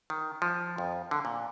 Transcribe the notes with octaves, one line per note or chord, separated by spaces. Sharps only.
D#3
F3
F2
D3
A#2